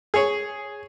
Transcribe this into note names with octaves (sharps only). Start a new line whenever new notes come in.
G#4 C#5